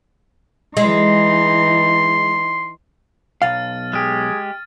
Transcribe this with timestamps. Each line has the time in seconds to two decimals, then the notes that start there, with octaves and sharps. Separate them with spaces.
0.77 E3 G#3 D#4 C6
3.42 B1 F5 F6 A6 D#7
3.93 G#3 G4 G#4